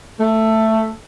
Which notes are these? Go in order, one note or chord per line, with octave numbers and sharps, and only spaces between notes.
A3